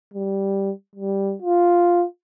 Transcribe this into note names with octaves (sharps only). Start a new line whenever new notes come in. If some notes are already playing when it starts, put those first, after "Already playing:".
G3
G3
F4